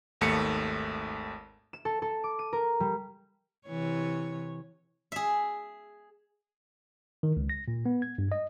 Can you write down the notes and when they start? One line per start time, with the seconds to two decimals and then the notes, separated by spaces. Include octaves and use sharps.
0.21 G#1 D#2 A3 C#7
1.73 E7
1.85 A4
2.02 A4
2.24 D6
2.39 D#7
2.53 A#4
2.80 G3
3.67 C3 E3 C#5
5.12 G#4 E5
7.23 D#3
7.37 C#2
7.50 A#6
7.68 A#2
7.86 B3
8.02 G#6
8.18 G2
8.32 D#5